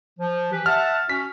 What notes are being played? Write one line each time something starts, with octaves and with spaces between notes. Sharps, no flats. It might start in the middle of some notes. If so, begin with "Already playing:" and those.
F3
E3 G4 B4
E5 F#5 A5 F6
C#4 F#4 B6